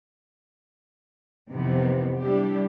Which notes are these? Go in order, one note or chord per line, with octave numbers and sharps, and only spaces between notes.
F2 C3 D#3 E3 B3
G3 D4 E4 G4